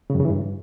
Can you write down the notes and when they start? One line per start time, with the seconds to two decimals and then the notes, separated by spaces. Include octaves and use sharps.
0.10 C#3
0.15 F#2
0.20 C#3
0.25 E3
0.30 G2